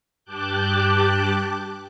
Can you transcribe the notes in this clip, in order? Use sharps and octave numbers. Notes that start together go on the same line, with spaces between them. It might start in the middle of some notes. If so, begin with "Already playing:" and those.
G2 G4 A5 D6 F#6 G6